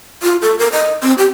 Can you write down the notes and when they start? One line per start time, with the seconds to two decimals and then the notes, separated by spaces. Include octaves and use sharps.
0.23 F4
0.42 A4
0.59 A#4
0.72 D#5
1.03 C4
1.18 G4